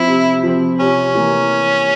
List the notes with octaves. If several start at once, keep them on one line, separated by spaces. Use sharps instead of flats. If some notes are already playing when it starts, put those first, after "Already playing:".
Already playing: F3 C4 E4
C3
F3 C4
C3 C#4
E3 A#3